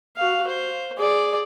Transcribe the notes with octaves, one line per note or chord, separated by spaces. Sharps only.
F#4 F5
C5
G#4 D5